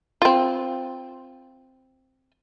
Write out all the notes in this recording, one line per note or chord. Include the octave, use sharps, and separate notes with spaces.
C4 F4